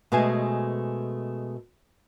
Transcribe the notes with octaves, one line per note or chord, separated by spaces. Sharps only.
B2 G#3 A3 G#4 C5 G#5